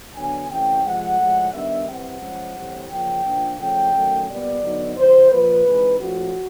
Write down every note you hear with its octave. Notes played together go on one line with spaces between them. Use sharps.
D3 F#3 B3 D4 G#5
C3 E3 A3 C#4 G5
C3 F3 G#3 F#5
A2 F3 G#3
D#3 G3 B3 D4 E5
E3 G3 C4 F#5
F3 G#3 C#4
A2 E3 G3 C4
C#3 F3 A#3 G5
A#2 F3 A#3 D4
C#3 F3 A3 C#4 G5
D#3 F#3 A3 C#4
A#2 G3 B3 D5
D3 F#3 B3 D#4
C3 E3 G3 C5
A#2 F3 A#3 B4
C3 E3 G#3 C4 D#4
A#2 F3 A3 C#4 F#4